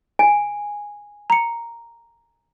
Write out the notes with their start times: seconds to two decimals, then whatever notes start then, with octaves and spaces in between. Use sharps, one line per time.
0.19 G#5
1.30 A#5 C#7